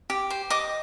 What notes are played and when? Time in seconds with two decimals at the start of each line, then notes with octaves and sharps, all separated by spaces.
0.10 G4
0.30 C5
0.50 D#5 D6